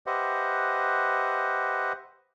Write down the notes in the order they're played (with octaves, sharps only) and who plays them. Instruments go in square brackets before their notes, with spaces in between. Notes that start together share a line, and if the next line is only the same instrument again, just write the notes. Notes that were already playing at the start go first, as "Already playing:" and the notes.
[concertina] G4 B4 C5 D#5 E5 F#5